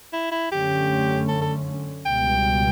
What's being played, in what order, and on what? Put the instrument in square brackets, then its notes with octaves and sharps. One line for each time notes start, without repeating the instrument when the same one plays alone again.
[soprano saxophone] E4
E4
[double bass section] F#2 D3 A3 C#4 [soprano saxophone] G4
[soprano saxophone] A4
A4
[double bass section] C#2 B2 G3 [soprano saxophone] G5